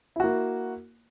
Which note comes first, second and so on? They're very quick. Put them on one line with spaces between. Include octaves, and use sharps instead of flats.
E4 F#4 A#3